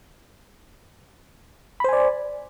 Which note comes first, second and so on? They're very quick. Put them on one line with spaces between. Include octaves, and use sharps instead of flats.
B5 C5 G#5 D5